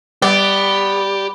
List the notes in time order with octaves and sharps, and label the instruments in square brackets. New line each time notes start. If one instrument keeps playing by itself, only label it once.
[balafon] G3 [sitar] B3 [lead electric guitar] G4 [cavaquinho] D5